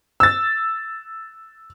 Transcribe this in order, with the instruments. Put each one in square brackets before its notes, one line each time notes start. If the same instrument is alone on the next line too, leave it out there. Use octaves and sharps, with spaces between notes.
[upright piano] E6 A6